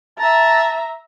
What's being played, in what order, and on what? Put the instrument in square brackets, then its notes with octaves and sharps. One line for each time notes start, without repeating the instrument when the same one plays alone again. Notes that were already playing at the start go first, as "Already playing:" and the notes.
[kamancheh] E5 A#5 [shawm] A5